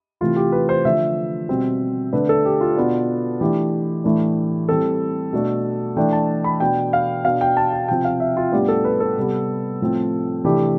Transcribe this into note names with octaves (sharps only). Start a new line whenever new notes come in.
C3 E3 A3 C4 F4
G4
B4
C5
D3 F3 A3 E5
B2 G3 C4
D3 A3 D4 B4
A4
G4
F4
B2 B3 D4
E3 A3 D4 G4
A2 E3 A3 D4
E3 G3 C4 A4
B2 A3 D4
E3 A3 D4 G5
A5
B5
B2 B3 D4 G5
F5
B2 B3 D4 F5
G5
A5
G5
C3 F3 C4 G5
F5
E5
F4
A2 G3 B3 D4 G4
A4
B4
A4
C3 G3 B3
A2 F3 C4
C3 E3 A3 D4 G4